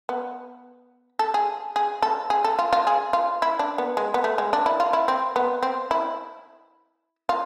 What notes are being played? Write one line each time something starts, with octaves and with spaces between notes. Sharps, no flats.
B3
A4
G#4
G#4
A4
G#4
A4
F4
F4
G#4
F4
E4
D4
B3
G#3
B3
A3
G#3
D4
E4
F4
E4
C4
B3
C4
E4
F4